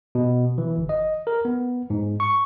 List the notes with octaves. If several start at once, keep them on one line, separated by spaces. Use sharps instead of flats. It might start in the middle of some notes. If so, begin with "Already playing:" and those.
B2
E3
G1
D#5
A#4
B3
G#2
C#6